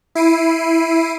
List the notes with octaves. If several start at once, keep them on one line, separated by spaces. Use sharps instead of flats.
E4 C7 D7 D#7